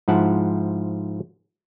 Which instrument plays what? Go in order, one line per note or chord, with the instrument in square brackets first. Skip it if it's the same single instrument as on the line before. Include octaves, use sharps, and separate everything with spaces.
[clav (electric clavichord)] G#2 F3 E4 F#5 A5